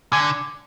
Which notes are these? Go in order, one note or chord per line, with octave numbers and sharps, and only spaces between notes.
D3 G#5